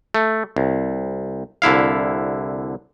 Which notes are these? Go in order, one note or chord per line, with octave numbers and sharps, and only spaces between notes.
A3
C2
C2 D3 E4 F5